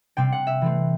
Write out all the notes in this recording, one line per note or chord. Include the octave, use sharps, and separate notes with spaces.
C3 G3 C4 G5
F#5
E5
E3 A3 C4